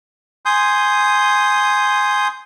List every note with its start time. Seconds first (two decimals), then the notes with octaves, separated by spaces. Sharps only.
0.45 G#5 C6 D#6 G6